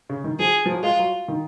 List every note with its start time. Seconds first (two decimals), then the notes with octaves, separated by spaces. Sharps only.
0.09 C#3
0.24 D#3
0.39 F3 G#4
0.65 F3
0.72 F#3
0.83 G#3 F4
0.99 F#3
1.28 D#3